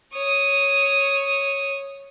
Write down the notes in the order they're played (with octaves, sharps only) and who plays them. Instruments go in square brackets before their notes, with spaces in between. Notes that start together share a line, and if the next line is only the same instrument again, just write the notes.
[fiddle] C#5 D#6